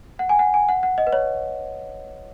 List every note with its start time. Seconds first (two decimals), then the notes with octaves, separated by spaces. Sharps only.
0.19 F#5
0.29 G#5
0.39 F#5
0.54 G#5
0.69 F#5
0.83 F#5
0.98 D#5
1.07 B4
1.13 C#5